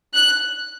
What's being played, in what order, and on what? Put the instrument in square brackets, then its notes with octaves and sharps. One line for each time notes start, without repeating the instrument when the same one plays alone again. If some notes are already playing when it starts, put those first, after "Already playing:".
[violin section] F#6